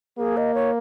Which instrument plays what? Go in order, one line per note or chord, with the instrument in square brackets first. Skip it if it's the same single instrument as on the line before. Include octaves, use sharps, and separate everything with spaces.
[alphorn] A#3 [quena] G#4
[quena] D#5
C#5